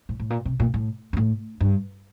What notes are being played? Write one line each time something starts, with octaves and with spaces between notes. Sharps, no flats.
A2
A2
A#2
C3
A#2
A2
G2
A2
G2